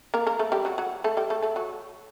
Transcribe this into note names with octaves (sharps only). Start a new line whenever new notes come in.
A#3 A#4
A#3 A#4
A3 A4
G3 G4
F#3 F#4
F#3 F#4
A3 A4
G3 G4
A3 A4
A3 A4
F#3 F#4